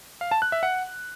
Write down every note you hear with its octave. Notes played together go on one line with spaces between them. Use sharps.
F5
A5
F#6
E5
F#5